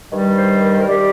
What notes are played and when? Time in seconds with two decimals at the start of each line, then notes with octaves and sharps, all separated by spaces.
0.11 G2 D#3 G3
0.38 C5
0.63 A#4
0.72 C5
0.80 A#4
0.88 D#3 G3 G4